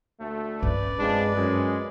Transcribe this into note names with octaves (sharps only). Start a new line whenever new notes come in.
D2 A3
G2 C#4 B4 D5
F3 G#3 C4 D4
F#2 G#3